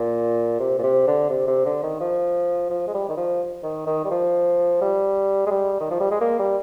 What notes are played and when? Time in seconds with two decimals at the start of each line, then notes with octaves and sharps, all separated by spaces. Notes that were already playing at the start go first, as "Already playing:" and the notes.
Already playing: A#2
0.59 C3
0.78 A#2
0.83 C3
1.07 D3
1.30 C3
1.47 C3
1.65 D3
1.83 D#3
2.00 F3
2.70 F3
2.87 G#3
2.94 G3
3.09 D#3
3.16 F3
3.63 D#3
3.86 D#3
4.04 G3
4.10 F3
4.81 G3
5.46 G#3
5.51 G3
5.80 D#3
5.90 F3
6.00 G3
6.11 G#3
6.21 A#3
6.39 G3